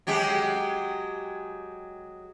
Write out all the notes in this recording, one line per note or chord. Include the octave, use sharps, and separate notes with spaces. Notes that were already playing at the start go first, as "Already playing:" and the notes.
F#3 G#3 G4